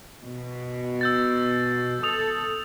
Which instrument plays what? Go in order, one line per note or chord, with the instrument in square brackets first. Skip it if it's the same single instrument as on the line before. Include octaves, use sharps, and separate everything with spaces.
[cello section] B2
[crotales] E6 G6 A6
[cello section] A4 [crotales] D#6 F7